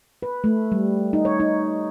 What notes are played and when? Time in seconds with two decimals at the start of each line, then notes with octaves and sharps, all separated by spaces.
0.22 B4
0.44 A3
0.72 G3
1.13 D#4
1.25 C#5
1.40 D#4